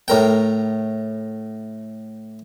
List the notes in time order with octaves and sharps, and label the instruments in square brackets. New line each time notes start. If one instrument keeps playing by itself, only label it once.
[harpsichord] A2 A#4 G5